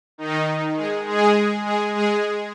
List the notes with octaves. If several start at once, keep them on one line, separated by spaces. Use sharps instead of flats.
D#3 D#4
G#3 G#4
G#3 G#4
G#3 G#4
G#3 G#4